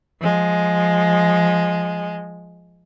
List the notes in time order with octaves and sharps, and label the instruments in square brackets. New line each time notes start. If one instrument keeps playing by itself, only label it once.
[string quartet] F3 G#3